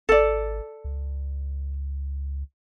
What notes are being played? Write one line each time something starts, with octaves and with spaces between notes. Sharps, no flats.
G#1 A4 D5
C#2